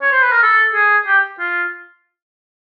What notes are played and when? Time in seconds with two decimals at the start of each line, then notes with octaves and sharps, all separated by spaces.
0.02 C#5
0.12 C5
0.22 B4
0.32 A#4
0.42 A4
0.74 G#4
1.06 G4
1.39 F4